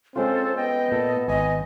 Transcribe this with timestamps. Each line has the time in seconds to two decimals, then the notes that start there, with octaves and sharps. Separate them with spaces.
0.16 G#3 C4 C#4 F4 A4 C5
0.57 B3 D#5 G5
0.92 A#2 A4
1.28 G#1 D#5 G#5